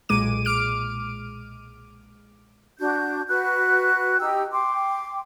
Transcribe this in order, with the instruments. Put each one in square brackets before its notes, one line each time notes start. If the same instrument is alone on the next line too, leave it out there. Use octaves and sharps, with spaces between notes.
[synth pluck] B1 A#2 G#3 D6 D#7
D6 F6 D7
[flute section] D4 F#4 G6
F#4 B4 F#6
D#4 G4 G5 E6
G5 C6 D6